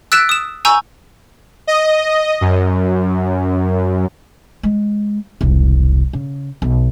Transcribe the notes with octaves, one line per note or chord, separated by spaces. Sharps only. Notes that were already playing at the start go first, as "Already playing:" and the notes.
E6 F#6 A6 B6 D7 E7
D#6 E7
G#5 A#5 C#6 E6 G6
D#5
F#2
G#3
E1 C2
C#3
B1